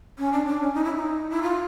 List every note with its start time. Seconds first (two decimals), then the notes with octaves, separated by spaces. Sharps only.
0.18 C#4
0.32 D4
0.46 D4
0.61 C#4
0.74 D#4
0.84 E4
0.95 D#4
1.30 E4
1.43 F4